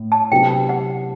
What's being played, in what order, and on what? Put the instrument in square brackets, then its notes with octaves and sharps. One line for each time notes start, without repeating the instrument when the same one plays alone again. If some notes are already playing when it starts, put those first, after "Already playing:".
Already playing: [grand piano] A2
[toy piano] A5
[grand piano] C3 F#3 B3 D4 F#4 [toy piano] G5
[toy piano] F#5